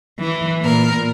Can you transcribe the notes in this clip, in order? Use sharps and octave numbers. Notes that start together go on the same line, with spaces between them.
E3
A#2 A#4